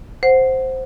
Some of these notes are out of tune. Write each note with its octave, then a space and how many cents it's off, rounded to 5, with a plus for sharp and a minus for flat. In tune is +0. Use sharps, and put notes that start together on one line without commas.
C5 +0 F#5 +0